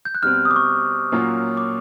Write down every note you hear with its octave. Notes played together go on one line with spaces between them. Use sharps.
G6
F#6
B2 G3 C4 F6
D#6
D6
C#6
A#2 F#3 A#3 C#4 F4
D6